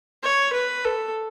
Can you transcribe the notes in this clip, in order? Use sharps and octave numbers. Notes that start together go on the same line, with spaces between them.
C#5
B4
A4